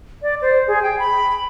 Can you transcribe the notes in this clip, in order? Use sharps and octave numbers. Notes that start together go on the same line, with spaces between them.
D5
C5
G#4
G5
B5